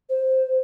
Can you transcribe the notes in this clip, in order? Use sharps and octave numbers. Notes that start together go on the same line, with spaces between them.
C5